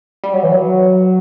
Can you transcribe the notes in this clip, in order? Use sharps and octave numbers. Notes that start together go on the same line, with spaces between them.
G3
F#3
E3
F#3